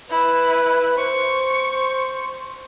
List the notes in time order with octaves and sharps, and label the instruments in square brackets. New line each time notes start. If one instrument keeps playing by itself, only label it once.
[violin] E4 [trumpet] B4
[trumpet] C5 [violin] C#6